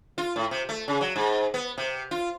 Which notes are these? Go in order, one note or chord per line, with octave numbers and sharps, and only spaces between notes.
F4
A2
C3
A3
C#3
F#3
G#2
B3
C3
F4